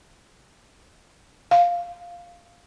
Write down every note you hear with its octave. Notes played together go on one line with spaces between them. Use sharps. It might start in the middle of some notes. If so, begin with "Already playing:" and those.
F5